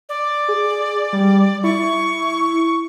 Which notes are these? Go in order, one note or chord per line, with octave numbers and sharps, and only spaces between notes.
D5
G#4
G3
E4 C#6